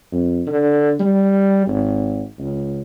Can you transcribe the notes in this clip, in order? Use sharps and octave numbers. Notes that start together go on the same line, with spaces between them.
F2
D3
G3
G#1
C#2